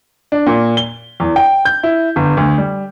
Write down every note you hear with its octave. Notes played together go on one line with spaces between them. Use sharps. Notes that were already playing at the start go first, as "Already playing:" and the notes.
D4
A#2
G7
E2
G5
G6
E4
G1
D2
G3